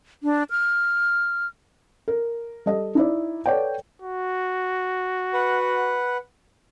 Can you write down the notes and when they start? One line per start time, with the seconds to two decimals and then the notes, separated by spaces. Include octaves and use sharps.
0.23 D4
0.50 F6
2.08 A#4
2.66 G3 A4 D#5
2.95 D#4 E4 D5
3.46 A4 B4 C#5 D5 F#5 G5
4.02 F#4
5.33 B4 F#5